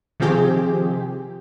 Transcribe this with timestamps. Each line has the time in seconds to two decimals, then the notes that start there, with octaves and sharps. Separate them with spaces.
0.20 C3 D#3 F3 C4 G4 G#4